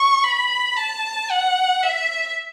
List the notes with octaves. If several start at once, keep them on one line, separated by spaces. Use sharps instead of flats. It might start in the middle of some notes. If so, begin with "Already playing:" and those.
Already playing: C#6
B5
A5
F#5
E5